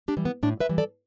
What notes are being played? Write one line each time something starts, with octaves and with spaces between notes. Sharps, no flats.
D4 G4
E3 G3
B3
A2 D4
B4 E5
E3 G3
A4 D5